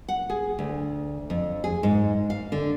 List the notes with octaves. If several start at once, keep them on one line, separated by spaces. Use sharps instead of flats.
F#5
G#4
D2
F2
G#4
G#2
F5
D3